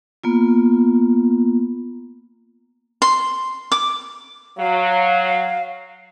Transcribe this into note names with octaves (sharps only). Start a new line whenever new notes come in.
A#3 B3 F4
C6
D6
F#3 F5